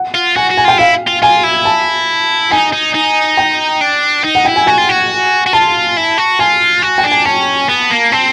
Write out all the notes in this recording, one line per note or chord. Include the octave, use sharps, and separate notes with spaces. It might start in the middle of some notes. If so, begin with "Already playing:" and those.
Already playing: F#5
F4
F#4 G#5
F#4
G#5
F4 G5
E4 F5
F4
F4 G#5
E4
A5
D#4 G#5
D#4
D#4
G5
D4
D#4
F#5
E4 G5
G#5
F#4 G#5
F4
F#4
F#4
F4 A5
E4
F#4
F4 G#5
F#4
G5
D4
G#5
C#4 A5
B3
A#3
C4 A5